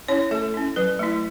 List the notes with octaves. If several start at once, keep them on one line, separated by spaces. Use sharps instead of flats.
C#4 E4 C#5
A3 A4
C#4 E4
F#3 B4
A3 E4